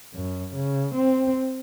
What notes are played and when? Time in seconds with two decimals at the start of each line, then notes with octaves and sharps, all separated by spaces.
0.14 F#2
0.55 C#3
0.96 C4